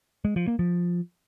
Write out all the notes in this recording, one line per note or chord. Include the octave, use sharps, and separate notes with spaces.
G#3
F3
A#3
F3